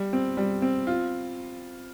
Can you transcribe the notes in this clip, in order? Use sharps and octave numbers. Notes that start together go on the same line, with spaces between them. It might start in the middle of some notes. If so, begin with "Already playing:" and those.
Already playing: G3
C4
G3
C4
F4